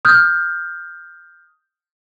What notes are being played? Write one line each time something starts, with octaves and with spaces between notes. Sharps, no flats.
D#6 F6 G6